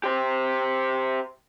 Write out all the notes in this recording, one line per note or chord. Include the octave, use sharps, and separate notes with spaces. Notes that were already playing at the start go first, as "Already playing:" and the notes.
G4 C5